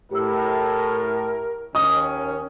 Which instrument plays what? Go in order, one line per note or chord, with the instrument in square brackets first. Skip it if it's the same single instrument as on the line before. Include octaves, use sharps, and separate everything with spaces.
[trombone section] A2 [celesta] G4 E6 [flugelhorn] A#4
[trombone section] D#2 D#3 [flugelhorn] C#4 [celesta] D#5 [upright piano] D#6